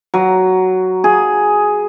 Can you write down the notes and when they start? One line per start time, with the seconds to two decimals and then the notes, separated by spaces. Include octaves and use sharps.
0.14 F#3
1.04 G#4